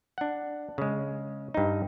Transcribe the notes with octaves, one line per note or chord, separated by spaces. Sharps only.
D4 F#5
C#3 G#3
G2 D#4